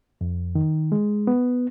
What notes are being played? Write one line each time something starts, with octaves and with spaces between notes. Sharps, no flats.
F2
D#3
G#3
B3